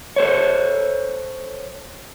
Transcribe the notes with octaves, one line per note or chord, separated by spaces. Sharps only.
A4 C5 C#5